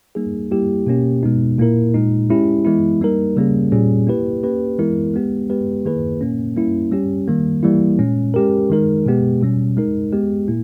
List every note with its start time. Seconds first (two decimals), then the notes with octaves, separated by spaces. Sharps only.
0.15 G3 A#3 D#4 G#4
0.51 G3 A#3 E4 G4
0.87 B2 A#3 C#4 G4
1.23 B2 G#3 B3 D#4
1.58 A#2 A#3 E4 A#4
1.94 A#2 G#3 D#4
2.30 G#3 C#4 E4 G4
2.65 E3 G#3 B3 E4
3.01 G3 A#3 D#4 A#4
3.36 C#3 G3 A#3 C#4 G#4
3.72 A#2 G3 C#4 G#4
4.07 A#3 E4 G4 B4
4.43 A#3 C#4 G4 B4
4.78 E3 G#3 B3 E4 A#4
5.14 G#3 B3 G4
5.49 G#3 B3 G4 B4
5.85 D#3 A#3 E4 G#4 B4
6.21 A#2 A#3 C#4
6.56 G3 A#3 C#4 E4
6.92 G3 C#4 G4
7.28 D#3 G3 A#3
7.63 E3 G3 A#3 E4
7.99 A#2 G#3 C#4
8.34 G#3 C#4 G4 A#4
8.70 D#3 G#3 D#4 A#4
9.06 B2 G#3 B3 G4
9.41 B2 G3 C#4
9.77 G#3 D#4 A#4
10.13 G#3 B3 G4
10.48 A#2 A#3 E4